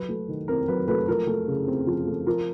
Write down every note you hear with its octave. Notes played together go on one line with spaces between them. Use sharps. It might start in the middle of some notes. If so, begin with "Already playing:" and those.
Already playing: F#3 B4
A3
D#3
C4 A#4
F#3 B4
A3 B4
F3 A#4
A3
C#3
C4
F3
A3
F3 A#4